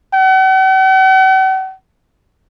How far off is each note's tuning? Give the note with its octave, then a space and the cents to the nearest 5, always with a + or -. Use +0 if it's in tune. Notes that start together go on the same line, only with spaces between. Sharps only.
F#5 +45